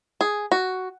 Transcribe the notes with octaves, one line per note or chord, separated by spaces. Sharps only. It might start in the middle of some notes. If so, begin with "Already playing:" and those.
G#4
F#4